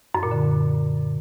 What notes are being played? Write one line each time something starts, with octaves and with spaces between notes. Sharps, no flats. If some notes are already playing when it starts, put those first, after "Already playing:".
F#2
A#2
D3